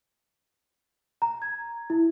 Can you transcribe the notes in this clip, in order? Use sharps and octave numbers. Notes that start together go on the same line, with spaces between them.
A#5
G#6
E4